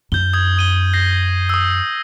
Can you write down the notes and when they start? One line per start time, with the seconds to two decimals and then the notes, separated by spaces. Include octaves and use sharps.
0.12 F#2 D#4 G6 G7
0.33 D#6 G6 G#6
0.57 D#6 D#7 G7
0.93 G6 A#6 C7
1.49 D#6 E6